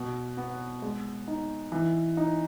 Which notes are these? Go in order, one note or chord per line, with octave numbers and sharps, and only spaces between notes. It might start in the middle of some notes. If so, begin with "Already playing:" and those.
Already playing: B2
B3
G#3
D#4
E3
D#4